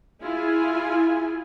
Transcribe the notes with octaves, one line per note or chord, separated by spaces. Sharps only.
E4 F4 G#4 G#5